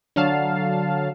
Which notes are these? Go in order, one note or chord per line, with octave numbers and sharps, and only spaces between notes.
D3 F#3 F5 A5